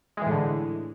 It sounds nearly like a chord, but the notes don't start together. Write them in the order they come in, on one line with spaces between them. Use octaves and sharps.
G#3 E3 A2 D3